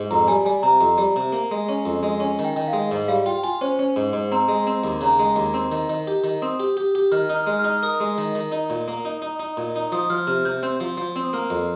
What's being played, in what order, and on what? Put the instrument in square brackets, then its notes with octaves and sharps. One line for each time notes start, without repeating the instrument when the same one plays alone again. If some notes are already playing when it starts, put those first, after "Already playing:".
Already playing: [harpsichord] G#2
[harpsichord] F2 [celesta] A#5
[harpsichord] G3 [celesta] G#5
[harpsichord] G3 [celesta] G#5
[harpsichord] C3 [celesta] A#5
[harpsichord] F2
G3
C3
A#3
G#3
C#4
F2
G#3
[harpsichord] C#4 [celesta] G#5
[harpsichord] D#3
[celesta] G5
[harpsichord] D#3
[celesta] F5
[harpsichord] G#3
[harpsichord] G#2 [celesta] D#5
[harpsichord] G3 [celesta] F5
[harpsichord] F4 [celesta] G5
[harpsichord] F4 [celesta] G#5
[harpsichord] C#4 [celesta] C5
[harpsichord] C#4
G#2
G#2
[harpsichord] C4 [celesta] A#5
[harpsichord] G#3
C4
D#2
[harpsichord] C#3 [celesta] A#5
[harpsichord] G#3
D#2
C4
D#3
D#3
G4
D#3
[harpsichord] C4 [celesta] D#6
[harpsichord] G4
G4
G4
[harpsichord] D#3 [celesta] F6
[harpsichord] D#4
[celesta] F6
[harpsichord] G#3
[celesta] F6
[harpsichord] D#4
[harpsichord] A#4 [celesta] D#6
[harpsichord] G#3
D#3
D#3
D#4
A#2
A#3
D#4
D#4
D#4
A#2
D#4
[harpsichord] F3 [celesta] D#6
[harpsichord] F3 [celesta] F6
[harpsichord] C3 [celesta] F6
[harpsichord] C3 [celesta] G6
[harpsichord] C4 [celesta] G6
[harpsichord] F3
F3
C4
[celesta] D#6
[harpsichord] A#3 [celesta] F6
[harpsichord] F2